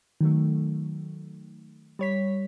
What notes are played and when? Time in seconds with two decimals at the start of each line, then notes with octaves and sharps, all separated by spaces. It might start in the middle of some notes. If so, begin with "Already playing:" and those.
0.21 D#3 F#3 A3
1.99 G3 C#5 B6